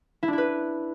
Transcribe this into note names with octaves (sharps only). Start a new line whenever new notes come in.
E4
D4
E4
B4